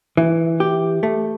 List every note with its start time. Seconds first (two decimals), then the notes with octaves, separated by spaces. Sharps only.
0.17 E3
0.60 G4
1.03 A3